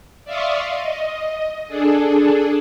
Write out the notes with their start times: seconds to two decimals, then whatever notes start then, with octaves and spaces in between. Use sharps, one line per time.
0.25 D5 E5 F5 C6 C#6 D#6
0.74 D#5
1.68 D4 G#4 A4